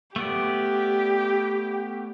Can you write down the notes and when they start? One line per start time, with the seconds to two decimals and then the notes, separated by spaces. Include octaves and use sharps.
0.16 A3 B3 G4 D5